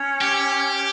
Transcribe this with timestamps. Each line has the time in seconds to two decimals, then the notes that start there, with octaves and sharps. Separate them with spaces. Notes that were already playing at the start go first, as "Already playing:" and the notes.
Already playing: C#4
0.22 G4